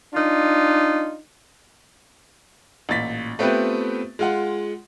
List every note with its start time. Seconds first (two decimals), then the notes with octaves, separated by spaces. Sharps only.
0.14 D4 D#4 F4
2.89 A1 A#2 A6 B6
3.39 A3 B3 C4 F4 G4 B4
4.19 G#3 F4 F#5